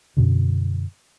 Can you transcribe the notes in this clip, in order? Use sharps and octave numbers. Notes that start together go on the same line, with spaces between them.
F#2 B2 D3